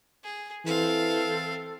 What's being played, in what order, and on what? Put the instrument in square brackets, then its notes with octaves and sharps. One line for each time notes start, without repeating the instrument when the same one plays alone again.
[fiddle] G#4
[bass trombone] E3 [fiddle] C4 F5 [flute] A4